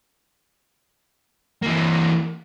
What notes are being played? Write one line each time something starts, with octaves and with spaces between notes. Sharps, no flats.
E3 A#3